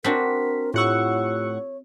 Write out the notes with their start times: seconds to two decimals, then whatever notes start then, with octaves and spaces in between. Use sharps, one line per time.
0.04 C4 D4 F#4 A#4 B6
0.74 A2 F4 G4 C#5 F#5 C#6 E6